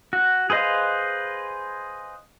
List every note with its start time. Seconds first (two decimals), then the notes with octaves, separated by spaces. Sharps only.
0.13 F#4
0.50 G#4 B4 C5 D#5 F5